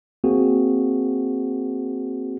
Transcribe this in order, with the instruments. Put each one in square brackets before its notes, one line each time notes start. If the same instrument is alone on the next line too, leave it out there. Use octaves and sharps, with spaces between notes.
[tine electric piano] A#3 C4 F#4 G#4